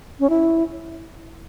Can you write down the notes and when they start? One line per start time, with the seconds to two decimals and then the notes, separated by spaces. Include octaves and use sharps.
0.20 C#4
0.30 E4